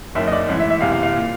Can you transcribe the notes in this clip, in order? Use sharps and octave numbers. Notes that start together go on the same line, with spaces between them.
F#1 F#2 D#3 E5
D#5
D5
A1 G#2 E3
E5
E5
F#1 E2 C3 E3 F5
F5
F5
A#2